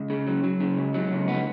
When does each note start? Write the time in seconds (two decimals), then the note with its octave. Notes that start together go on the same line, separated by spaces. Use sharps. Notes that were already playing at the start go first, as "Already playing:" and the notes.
Already playing: C#2
0.10 C#3
0.27 F#3
0.43 F#3
0.60 C#3
0.77 C#2
0.94 F#3
1.12 C#2
1.28 B3